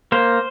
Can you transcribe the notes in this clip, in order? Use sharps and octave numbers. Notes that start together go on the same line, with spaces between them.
A#3 C5